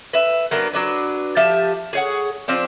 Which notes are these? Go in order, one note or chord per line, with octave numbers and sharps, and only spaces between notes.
B4 E5
F#3 A#3 B3 D4
F#3 D4 B4
F3 G4 E5 A5
G#4 C#5 F#5
F3 C4 D4